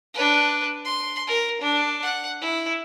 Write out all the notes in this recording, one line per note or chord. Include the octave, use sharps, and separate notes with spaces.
D4 B4
C6
A#4
D4
F#5
E4